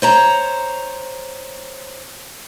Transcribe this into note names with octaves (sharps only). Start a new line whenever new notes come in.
C5 C#5 A#5